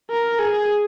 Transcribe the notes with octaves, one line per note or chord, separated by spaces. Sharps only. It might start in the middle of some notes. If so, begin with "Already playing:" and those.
A#4
G#4